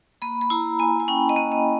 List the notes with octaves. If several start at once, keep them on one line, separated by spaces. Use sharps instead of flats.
A#3 B5
B5
E4 A#5
A#3 G#5
G#5
C#4 G5
D#5
A#3
D#5